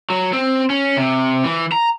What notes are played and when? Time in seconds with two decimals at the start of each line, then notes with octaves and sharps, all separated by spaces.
0.10 F#3
0.33 C4
0.70 C#4
0.97 C3
1.44 E3
1.72 A#5